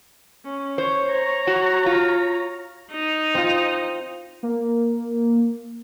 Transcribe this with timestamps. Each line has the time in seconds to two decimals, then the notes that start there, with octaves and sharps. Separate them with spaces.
0.45 C#4
0.78 C5 C#5
1.10 C#5 A#5
1.47 F#4
1.86 F4
2.92 D#4
3.34 C4 F4
4.43 A#3